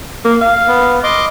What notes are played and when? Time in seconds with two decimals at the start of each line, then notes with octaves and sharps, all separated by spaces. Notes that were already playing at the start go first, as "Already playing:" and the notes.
0.25 A#3
0.41 F5
0.68 B3
1.03 D#5 C6 D6